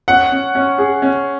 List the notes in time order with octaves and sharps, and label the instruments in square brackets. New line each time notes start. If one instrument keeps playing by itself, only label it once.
[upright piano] C#4 [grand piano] F#5
[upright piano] C#4
C#4
G#4
C#4